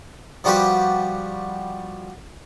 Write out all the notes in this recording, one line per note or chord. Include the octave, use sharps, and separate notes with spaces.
F3 G3 F#4 G4 B4